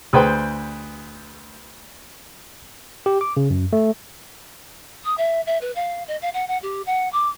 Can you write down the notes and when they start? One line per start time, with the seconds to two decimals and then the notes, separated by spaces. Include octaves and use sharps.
0.13 D2 G#4 B4 C5 G5 B5
3.06 G4
3.21 D6
3.37 C#3
3.50 F#2
3.73 A3
5.05 D#6
5.17 E5
5.46 E5
5.61 B4
5.76 F5
6.08 D#5
6.22 F5
6.34 F#5
6.48 F#5
6.62 G4
6.86 F#5
7.13 D6